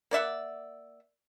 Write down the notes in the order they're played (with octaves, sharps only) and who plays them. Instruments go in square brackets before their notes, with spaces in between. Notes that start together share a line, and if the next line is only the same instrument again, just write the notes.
[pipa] A#3 D5 E5 F#5